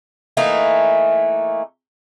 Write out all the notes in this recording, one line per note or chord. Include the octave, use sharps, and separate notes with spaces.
E3 A3 A#3 D#4